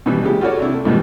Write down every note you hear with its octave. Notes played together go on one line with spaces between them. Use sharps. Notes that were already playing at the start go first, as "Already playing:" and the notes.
B2 D#3 E3 G3
A#1 C#3 G#3 G4
F4 F#4 A4 C#5 D5
C3 D4 E4
A3
G#2 B2 D#3 E3 G3